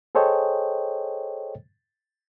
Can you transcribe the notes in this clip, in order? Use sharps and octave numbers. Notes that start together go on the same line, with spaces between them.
G#4 A4 C5 C#5 D#5 G5